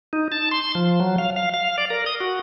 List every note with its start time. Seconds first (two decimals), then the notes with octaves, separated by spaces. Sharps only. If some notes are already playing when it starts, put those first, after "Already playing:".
0.13 D#4
0.32 A5
0.51 C6
0.75 F3
1.00 F#3
1.18 F5
1.36 F5
1.54 F5
1.78 D5
1.90 A#4
2.06 D#6
2.20 F#4